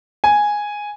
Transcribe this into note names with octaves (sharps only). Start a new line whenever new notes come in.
G#5